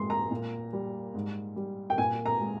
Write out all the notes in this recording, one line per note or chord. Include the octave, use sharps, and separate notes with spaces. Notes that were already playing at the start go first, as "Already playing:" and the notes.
Already playing: A#2 G#3 C6
A#5
A#2
G3
G#2
G3
G5
A#2 G#5
A#5
G#3